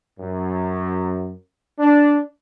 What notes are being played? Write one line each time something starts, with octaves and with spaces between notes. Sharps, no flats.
F#2
D4